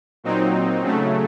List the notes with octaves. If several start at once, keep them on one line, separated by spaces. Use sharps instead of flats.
A#2 F#3 C4 D#4
C#3 F#3 A3